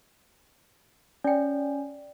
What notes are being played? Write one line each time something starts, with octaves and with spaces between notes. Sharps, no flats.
C#4 D5 G5